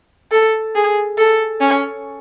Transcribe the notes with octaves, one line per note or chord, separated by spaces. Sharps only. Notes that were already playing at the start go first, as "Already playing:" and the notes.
A4
G#4
A4
C#4